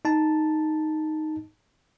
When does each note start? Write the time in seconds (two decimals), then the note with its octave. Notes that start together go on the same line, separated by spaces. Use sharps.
0.05 D#4 A5